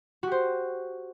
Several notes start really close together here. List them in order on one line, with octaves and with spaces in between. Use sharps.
F#4 G4 C5